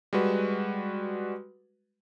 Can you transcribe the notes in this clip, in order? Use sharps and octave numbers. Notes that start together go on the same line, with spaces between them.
G3 G#3 F#4 B4